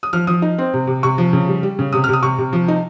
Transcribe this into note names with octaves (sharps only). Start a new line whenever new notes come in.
D#6
F3 F6
F3 D#6
D#4
C4
C3
C3
C3 C#6
F3
C#3
G3
G3
C#3
C3 D#6
F6
C3 D#6
C3 C#6
C3
F3
D#4